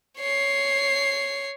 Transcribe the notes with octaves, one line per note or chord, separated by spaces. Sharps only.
C#5 C7